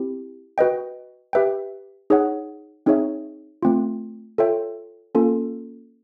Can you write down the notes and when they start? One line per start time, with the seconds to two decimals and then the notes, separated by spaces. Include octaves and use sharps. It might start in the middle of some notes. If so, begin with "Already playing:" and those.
Already playing: C4 E4 G4
0.58 F#4 B4 D#5 G5
1.33 G4 B4 E5 G5
2.10 D#4 G#4 C#5 F#5
2.86 C4 D#4 G#4 C#5 E5
3.63 A3 C4 F4
4.38 F4 A4 C#5 E5 G5
5.15 A#3 C#4 F4 A4